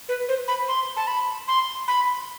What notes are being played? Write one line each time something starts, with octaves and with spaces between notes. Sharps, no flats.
B4
C5
B5
C6
A5
B5
C6
B5